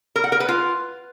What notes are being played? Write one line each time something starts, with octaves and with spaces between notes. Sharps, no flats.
A#4
F#5
A#4
B4
F4